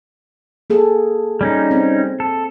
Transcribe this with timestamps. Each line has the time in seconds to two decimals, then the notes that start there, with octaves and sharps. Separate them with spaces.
0.70 A#3 G#4 A4
1.41 G3 C#4 D#4
1.71 C4
2.20 A4